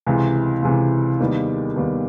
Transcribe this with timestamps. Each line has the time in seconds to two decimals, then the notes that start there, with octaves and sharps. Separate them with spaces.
0.06 C#2 C3 E3
0.63 C#2 C3 E3
1.20 D#2 D#3 G3 B3
1.76 D#2 D#3 G3 B3